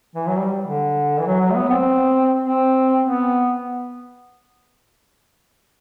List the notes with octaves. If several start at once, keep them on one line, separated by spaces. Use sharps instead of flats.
E3
F#3
G3
D3
E3
F#3
F#3
A3
B3
C4
C4
B3